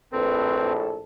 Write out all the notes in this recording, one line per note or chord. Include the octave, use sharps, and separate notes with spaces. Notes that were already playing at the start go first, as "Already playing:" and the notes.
A#1 A2 C4 A4 B4